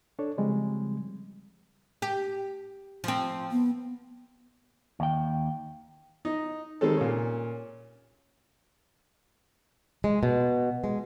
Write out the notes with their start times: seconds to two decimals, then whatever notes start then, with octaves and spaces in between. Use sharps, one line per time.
0.19 D4 A4 C#5
0.38 C#3 F3 G3 G#3 C4
2.02 G4
3.04 F3 C4
3.52 B3
5.00 D#2 G5
6.25 D#4
6.81 D#3 G3 G#3 C4 A4
6.97 A#2 C#4
10.04 G#3
10.23 B2
10.84 G#3